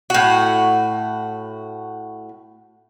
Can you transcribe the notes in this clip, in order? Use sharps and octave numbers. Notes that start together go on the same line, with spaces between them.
A2 F#4